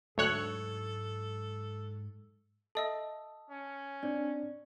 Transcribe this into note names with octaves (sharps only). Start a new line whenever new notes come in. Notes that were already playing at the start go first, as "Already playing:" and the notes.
D2 G#2 F#3 G#3 A4 C#5 F#6
A4 D#5 E5 A5 D#6 E6
C#4
C4 D4 D5